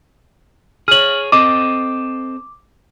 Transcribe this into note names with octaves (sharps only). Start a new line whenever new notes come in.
G#4 C#5 F6 F#7
C4 A4 D#5 D6